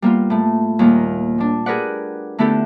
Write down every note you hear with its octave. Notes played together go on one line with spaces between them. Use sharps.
G3 A#3 B3 F4
A2 A3
D#2 A#2 G3 A#3
G3 D4
G4 G#4 A#4 B4 D5 F#5
D3 A3 B3 E4 G4 A4